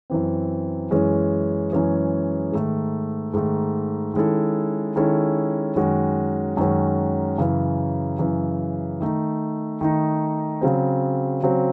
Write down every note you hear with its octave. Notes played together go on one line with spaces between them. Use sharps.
F#2 E3 C4
F#2 E3 G#3 C#4 G#4
F#2 E3 G#3 C#4 G#4
G#2 D#3 A3
G#2 D#3 A3
D#3 G#3 C#4 E4 A4
D#3 G#3 C#4 E4 A4
F#2 D#3 G#3 C#4 F#4
F#2 D#3 G#3 C#4 F#4
F#2 C#3 E3
F#2 C#3 E3
D#3 A3 D#4
D#3 A3 D#4
C#3 F#3 C4
C#3 F#3 C4